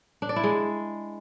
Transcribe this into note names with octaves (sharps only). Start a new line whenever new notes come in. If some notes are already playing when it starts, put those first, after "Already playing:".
D4
D5
E4
G#3